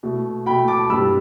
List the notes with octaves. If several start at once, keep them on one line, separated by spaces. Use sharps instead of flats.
B2 A3
B2 A3 G5 B5
A5 D6
G2 G3 B5 E6